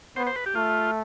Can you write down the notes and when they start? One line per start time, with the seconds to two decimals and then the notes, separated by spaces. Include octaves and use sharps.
0.16 B3 C5
0.27 C5
0.36 B4
0.46 G4
0.55 A3 F4